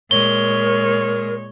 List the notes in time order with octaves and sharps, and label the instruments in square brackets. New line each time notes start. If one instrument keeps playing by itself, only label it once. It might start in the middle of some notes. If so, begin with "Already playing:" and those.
[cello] A#2 G#3 [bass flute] A#4 [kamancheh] C#5 [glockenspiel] G7